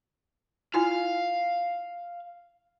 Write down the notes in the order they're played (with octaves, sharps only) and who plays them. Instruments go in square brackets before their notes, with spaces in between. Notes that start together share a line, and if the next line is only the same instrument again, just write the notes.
[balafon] E4 F4 G#5 [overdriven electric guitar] F5